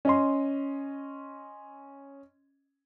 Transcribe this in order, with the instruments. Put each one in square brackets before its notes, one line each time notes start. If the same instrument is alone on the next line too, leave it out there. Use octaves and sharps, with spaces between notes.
[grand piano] C#4 D#5 C6